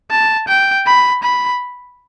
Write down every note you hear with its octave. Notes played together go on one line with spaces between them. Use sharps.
A5
G5
B5
B5